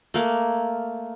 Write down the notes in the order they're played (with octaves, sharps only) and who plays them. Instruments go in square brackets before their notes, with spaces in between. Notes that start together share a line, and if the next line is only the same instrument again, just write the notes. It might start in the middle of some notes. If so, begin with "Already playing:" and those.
[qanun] A3 A#3